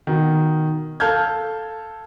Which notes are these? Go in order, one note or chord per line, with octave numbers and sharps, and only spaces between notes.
B2 D#3
A4 F5 A5 F6 G6 G#6